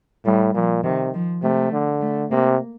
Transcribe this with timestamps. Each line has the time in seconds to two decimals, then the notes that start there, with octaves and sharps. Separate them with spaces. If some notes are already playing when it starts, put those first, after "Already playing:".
0.25 A2 G3
0.54 A#2 F3
0.84 C3 D#3
1.14 F3
1.43 C3 A3
1.72 D3
2.01 A3
2.30 C3 A#3